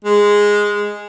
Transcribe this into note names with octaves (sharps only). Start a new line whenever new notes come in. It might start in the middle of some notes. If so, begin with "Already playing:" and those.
G#3